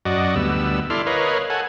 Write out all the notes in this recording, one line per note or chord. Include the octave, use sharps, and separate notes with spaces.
F#2 F#4 D5 D#5
D2 G3 B3 E6
E4 A4 D5 C6 F6
A#4 B4 C#5 D#5 F5
A4 F#5 G#5